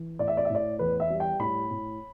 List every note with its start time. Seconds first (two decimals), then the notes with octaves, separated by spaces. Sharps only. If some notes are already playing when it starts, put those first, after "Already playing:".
Already playing: E3
0.19 A2 D5
0.28 E5
0.37 D5
0.45 E5
0.50 A2
0.55 D5
0.79 E2 B4
1.00 E5
1.10 G3
1.20 G5
1.39 A2 B5
1.71 A2